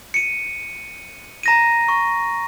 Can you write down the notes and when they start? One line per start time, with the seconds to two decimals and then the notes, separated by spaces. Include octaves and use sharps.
0.14 C#7 D#7
1.43 A#5 A#6 D#7
1.88 C#6